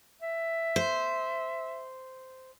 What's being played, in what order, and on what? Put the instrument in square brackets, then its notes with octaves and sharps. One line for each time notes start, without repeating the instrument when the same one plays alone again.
[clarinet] E5
[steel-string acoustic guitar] C5